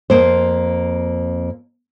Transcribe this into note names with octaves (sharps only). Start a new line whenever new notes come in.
F2 A#3 C5